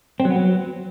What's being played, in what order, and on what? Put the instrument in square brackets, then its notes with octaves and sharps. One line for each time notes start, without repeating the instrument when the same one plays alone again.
[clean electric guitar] C4
F#3
B3
F#3